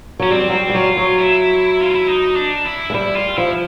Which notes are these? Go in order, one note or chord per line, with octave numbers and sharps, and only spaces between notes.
F#3 C#4
G3 C4
F#3
G3
G3
F#3 F4
F#3
E4
F4
E4
D#4
D4
E4
G#3
G3 E4
F4
F3 E4